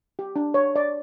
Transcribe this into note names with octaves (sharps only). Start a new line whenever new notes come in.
G4
D4
C#5
D5